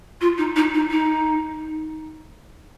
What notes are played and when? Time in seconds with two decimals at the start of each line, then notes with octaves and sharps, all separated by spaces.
0.21 F4
0.38 D#4
0.56 D#4
0.74 D#4
0.91 D#4